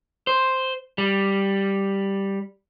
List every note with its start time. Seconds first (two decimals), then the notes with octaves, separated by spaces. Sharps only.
0.27 C5
0.98 G3